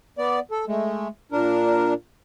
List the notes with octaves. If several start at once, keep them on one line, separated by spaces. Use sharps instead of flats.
B3 D5
A4
G#3 A3
A#2 D4 A#4